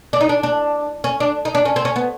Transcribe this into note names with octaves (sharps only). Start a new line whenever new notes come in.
D4
D#4
D4
D4
C#4
D4
D#4
D4
C#4
C4
C#4
B3